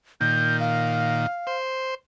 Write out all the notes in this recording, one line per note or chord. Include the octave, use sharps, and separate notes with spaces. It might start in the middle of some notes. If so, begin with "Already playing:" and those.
A#2 D#3 G6
F5
C5